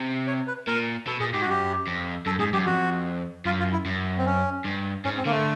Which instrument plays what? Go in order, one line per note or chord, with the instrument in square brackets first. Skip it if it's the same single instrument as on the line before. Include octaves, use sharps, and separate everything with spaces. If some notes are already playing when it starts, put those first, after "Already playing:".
Already playing: [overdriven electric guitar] C3
[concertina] C#5
B4
[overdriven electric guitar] A#2 [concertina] A#4
[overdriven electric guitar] B2 [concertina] A4
[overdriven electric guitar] A#2 [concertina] G#4
[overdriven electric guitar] G#2 [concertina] G4
[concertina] F#4
[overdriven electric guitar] F#2 [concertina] G4
[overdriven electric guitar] F2
[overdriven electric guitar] F#2 [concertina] A4
[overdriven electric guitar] G#2 [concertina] G#4
[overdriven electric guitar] F#2 [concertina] G4
[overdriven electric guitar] F2 [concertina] F#4
[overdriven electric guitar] F#2 [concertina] F4
[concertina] F4
E4
[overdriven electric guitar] F#2
[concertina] C4
C#4
[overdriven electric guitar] G2
[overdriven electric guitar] G#2 [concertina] C#4
[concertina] C4
[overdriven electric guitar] D3 [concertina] A#3
[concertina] A3